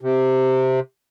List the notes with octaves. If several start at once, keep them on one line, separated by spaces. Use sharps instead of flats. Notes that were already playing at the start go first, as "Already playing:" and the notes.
C3